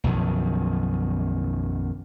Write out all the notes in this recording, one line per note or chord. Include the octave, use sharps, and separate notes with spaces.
B1 F#2 D#3 F3